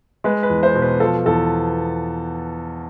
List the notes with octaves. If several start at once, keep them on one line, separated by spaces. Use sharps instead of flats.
G#3 B4
B4
E2
C5
B2
B4
F3 A4
E2 A4